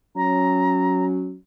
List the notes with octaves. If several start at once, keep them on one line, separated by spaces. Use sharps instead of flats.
F#3 C#4 A#5